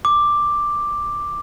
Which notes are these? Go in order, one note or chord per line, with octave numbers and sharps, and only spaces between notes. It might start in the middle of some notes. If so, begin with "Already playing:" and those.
D6